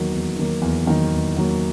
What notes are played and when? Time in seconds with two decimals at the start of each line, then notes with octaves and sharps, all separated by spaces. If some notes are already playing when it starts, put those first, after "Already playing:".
Already playing: E2 D#3 F#3 A#3
0.12 E2
0.36 D#3 F#3 A#3
0.62 E2
0.86 D#3 F#3 A#3
1.12 E2
1.37 D#3 F#3 A#3